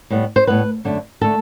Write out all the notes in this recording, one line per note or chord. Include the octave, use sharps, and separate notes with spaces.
A2 G3 B3
C5
A2 G3 B3 B4
F#2 D3 A3
D3 A3 A4